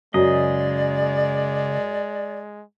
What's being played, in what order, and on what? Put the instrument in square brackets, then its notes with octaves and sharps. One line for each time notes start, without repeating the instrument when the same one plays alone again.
[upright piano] F#2 [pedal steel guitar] C#3 D#5 [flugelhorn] G#3 [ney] D5